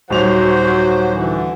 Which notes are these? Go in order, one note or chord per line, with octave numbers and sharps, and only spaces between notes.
D#1 F#3 F#4 C5 F7
D3 E3